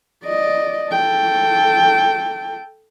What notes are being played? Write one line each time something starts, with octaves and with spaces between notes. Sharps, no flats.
D5 D#5
A4 G5